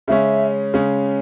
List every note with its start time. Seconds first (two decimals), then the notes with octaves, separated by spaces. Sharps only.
0.08 C#3 G#3 C#4 E5
0.74 C#3 G#3 C#4